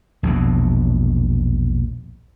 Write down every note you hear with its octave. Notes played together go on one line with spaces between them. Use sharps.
A#1 E2 B2